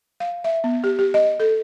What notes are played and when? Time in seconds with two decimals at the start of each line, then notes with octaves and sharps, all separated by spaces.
0.20 F5
0.44 E5
0.64 B3
0.84 G4
0.99 G4
1.14 D#5
1.40 A4